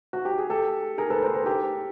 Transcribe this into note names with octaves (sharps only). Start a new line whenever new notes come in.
F#4
G4
G#4
G4 A4
G#4 A#4
A4 B4
A#4 C5
A#4 C5
G4 A4